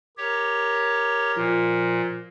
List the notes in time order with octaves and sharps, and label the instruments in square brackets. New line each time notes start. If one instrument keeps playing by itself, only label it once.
[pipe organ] G4 C#5 [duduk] A#4
[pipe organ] A#2 [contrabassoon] F3